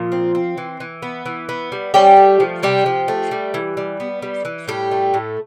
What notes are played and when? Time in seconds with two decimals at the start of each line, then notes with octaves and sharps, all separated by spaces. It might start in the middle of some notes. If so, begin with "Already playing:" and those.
Already playing: A#2 F3 F4
0.12 C4
0.35 C4
0.58 E3
0.80 E3
1.02 B3
1.26 E3
1.49 B3
1.72 G3
1.94 G3 C#4 G4
2.17 A3
2.40 F3
2.63 C3 G3 G4
2.86 F3
3.08 A3
3.31 G3
3.54 E3
3.77 G3
4.00 B3
4.22 G3
4.45 E3
4.68 A2 G3 G4
4.91 A3
5.14 A2